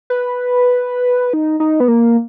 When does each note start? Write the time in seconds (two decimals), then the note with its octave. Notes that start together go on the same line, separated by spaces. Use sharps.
0.10 B4
1.33 D#4
1.60 D#4
1.80 B3
1.88 A#3